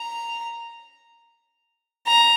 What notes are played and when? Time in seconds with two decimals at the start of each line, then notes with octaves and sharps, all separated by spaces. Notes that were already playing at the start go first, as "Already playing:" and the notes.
Already playing: A#5
2.07 A#5